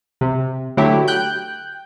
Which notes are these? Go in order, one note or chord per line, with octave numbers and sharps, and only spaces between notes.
C3
D3 F#3 A3 E4 G4
G5 F#6 G6